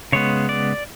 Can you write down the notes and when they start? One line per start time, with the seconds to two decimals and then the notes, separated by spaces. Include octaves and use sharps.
0.12 C#3 G#3 B3 C#5
0.49 D5